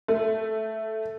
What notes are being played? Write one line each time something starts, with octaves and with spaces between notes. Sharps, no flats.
A3